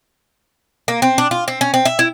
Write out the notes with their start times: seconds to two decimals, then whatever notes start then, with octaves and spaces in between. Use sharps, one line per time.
0.88 A#3
1.02 C4
1.18 D4
1.31 F4
1.48 C4
1.61 C#4
1.74 C4
1.85 E5
1.99 E4